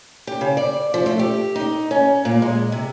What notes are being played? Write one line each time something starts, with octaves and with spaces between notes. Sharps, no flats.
G4
C#3
D5
F3
A3
G4
D#4
C#4
A#2
G#3
C3